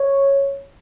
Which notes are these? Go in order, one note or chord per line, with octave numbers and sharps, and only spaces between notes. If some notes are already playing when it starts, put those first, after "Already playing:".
Already playing: C#5